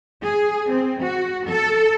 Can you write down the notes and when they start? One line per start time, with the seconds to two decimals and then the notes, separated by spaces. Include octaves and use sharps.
0.24 G#4
0.71 C4
1.03 F#4
1.48 A4